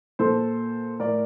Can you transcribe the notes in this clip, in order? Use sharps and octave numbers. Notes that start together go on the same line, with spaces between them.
A#2 A4 C5
A2 A#4 D5